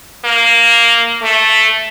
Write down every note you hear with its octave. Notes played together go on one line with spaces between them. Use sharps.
A#3
A3